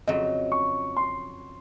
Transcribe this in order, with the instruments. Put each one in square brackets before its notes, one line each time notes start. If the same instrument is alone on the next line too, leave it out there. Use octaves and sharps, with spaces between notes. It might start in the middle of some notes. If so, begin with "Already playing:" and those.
[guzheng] F2 C#3 F#3 [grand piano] D#5
[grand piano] C#6
C6